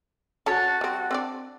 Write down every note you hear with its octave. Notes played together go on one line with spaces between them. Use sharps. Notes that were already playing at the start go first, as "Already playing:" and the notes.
C#4 F#4 A4 C#5 A5
G3 C4
C4 D4 D5